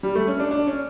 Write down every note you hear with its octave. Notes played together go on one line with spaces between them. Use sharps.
G3
A3
C#4
D4
D4
C#4